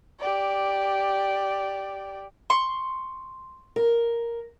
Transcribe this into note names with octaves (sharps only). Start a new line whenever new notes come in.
G4 D5
C6 C#6
A#4